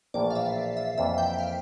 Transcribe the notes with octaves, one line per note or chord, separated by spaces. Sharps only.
A#1 A2 E3 A#3 D5
F5
E5
E5
F2 E3 A#3 E4 E5
G5
F5